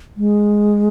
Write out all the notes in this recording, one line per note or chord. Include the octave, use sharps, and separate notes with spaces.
G#3